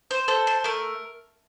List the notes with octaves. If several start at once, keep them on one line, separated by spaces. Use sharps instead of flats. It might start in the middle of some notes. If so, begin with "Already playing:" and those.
C5
A4 C5
C5
A3 A#4